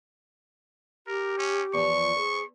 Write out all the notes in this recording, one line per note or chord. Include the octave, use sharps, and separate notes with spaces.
G4 A#4
C#4
E2 F3 C#6
G#4 C5